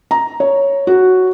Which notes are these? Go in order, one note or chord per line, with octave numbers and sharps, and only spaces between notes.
A#5
C#5
F#4